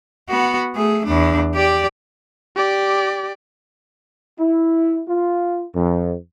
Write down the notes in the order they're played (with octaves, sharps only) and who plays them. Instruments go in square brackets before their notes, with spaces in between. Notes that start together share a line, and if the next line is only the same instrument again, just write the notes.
[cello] B3 F#4
A3 G#4
E2 D4
G4 D5
[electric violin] G4 D5
[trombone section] E4
F4
F2